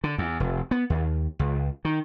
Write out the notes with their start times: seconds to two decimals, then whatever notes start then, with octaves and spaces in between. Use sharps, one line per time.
0.04 D3
0.18 E2
0.40 F1
0.71 B3
0.90 D#2
1.39 C#2
1.85 D#3